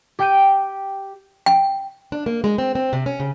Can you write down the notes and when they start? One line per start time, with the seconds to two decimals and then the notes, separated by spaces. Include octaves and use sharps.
0.19 G4 G5 G6 D7 D#7
1.46 G5
2.12 D4
2.26 A#3
2.44 G#3
2.58 C4
2.75 C4
2.93 C3
3.06 C#4
3.20 C#3